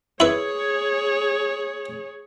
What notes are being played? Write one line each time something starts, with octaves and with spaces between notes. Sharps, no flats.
E4 G#4 B4 C#5